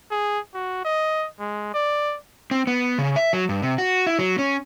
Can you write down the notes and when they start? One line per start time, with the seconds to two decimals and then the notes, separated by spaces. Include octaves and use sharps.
0.11 G#4
0.54 F#4
0.85 D#5
1.40 G#3
1.74 D5
2.51 C4
2.67 B3
2.98 C#3
3.16 E5
3.33 F#3
3.49 G2
3.62 C3
3.78 F#4
4.07 E4
4.19 F#3
4.39 C#4